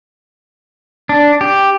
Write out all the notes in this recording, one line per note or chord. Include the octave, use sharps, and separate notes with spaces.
D4
G4